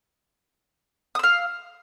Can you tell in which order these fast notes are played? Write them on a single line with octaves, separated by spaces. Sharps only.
D#6 E6 F5